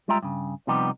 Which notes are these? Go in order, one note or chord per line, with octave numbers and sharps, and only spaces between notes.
G3 G#3 F4 E5 G5 A#5
G2 C#3
C3 F3 G3 B3 D#4 G4